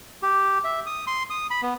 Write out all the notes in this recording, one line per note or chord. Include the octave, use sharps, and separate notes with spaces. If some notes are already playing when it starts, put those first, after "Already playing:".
G4
E5
D#6
C6
D#6
B5
B3